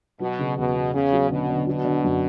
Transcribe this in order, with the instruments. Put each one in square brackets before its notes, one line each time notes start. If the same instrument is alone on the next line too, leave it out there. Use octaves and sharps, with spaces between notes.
[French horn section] B2 [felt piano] F#3
[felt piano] C#3
[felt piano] E2 [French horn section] B2
[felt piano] B3
[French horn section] C#3 [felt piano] C#4
[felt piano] F#3
[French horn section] B2 [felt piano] D3
[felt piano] D3
[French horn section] B2 [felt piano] F#3
[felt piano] D3
F#2